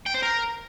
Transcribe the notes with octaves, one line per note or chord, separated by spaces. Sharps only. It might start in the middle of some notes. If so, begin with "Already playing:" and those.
G5
C5
A#4